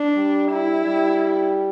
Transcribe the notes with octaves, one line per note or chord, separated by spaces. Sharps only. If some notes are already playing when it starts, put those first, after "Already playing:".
Already playing: D4
G3
E4
G3